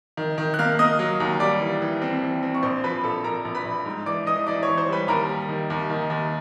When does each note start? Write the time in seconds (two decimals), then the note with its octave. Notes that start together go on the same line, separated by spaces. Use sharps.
0.17 D#3
0.38 D#3
0.54 F#6
0.59 A#3 F5 F6
0.79 A#3 D#5 D#6
0.99 F#3
1.20 D#2
1.40 G3 D5 D6
1.61 E3
1.82 E3
2.02 C4
2.22 E3
2.43 C4
2.55 C#6
2.63 A#1 C5 C6
2.84 F3 B4 B5
3.04 A#1 A4 A5
3.24 A#1 A#4 A#5
3.45 A#1
3.55 B4 B5
3.65 A#1
3.86 G#2
4.06 E3 D5 D6
4.27 E3 D#5 D#6
4.47 E3 D5 D6
4.63 C#5 C#6
4.68 E3
4.78 C5 C6
4.89 G3 B4 B5
5.08 D#2 A#4 A#5
5.29 G3
5.49 D#3
5.70 D#2
5.90 D#3
6.10 D#2